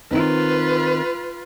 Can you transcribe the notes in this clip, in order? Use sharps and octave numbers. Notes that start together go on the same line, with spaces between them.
D#3 C4 D#4 F4 B4